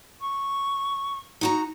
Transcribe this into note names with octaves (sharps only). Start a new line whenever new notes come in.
C#6
D#4 F#4 A#5